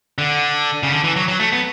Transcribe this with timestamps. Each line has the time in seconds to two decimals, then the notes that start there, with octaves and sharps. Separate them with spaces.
0.18 D3
0.83 C#3
0.92 D3
1.04 E3
1.16 F#3
1.28 F#3
1.40 A3
1.52 B3